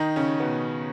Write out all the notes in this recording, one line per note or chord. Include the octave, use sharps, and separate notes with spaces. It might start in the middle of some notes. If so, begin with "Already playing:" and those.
Already playing: D#3 D#4
C#3 C#4
B2 B3